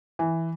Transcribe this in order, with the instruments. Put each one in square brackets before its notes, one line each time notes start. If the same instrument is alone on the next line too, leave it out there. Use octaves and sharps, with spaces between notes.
[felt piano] E3